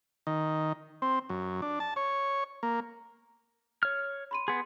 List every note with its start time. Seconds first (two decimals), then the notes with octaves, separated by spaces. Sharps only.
0.27 D#3
1.02 C4
1.29 F#2
1.62 D4
1.80 A5
1.96 C#5
2.63 A#3
3.83 C#5 F6
4.31 B5 C6 D#7
4.48 B3 G#4 C6